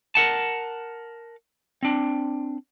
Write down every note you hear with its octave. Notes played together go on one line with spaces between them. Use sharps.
A#4 F#5 A5
C4 D4